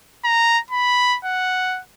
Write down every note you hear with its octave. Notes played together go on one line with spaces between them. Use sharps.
A#5
B5
F#5